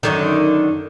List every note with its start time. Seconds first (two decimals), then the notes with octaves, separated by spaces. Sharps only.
0.03 F#2 D3 D#3